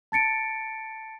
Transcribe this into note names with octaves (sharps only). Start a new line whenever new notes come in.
A5 A6 C#7 D7